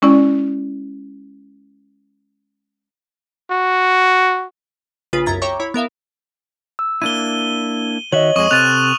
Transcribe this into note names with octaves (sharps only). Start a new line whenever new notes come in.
G#3 C#4 E4 D5
F#4
A#1 C#3 F4 B4 D#6
C2 F#2 A#5 G#6 A6 B6
C#5 E5 G5 A#5 C#6 D6
E4 C#5 B5
B3 A#4 E5 F5
E6
A#3 D4 E4 D#7 G7
D#3 F#4 C#5 D#5 E5 F#7
F2 G#3 C#6 D#6 D#7
C3 C4 A4 F6 F#6 A6 D#7 F7